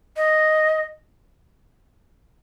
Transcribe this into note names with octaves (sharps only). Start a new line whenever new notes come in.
D#5